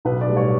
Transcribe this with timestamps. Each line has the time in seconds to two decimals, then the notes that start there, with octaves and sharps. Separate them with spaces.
0.05 B1 B4
0.21 D5
0.29 A2 G3
0.37 C#5